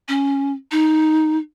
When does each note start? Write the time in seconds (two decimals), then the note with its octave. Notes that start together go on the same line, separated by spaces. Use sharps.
0.08 C#4
0.71 D#4